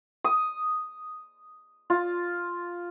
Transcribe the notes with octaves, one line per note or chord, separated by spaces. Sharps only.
D#6
F4